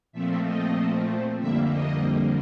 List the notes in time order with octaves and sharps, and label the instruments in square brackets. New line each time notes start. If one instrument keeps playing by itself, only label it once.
[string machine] A#2 F3 A3 C4 E5
D#5
F2 D3 G3 A#3 E5
D#5